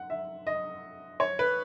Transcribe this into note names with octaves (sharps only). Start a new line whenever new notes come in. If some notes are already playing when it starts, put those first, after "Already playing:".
Already playing: F#5
E5
D#5
C#5
B4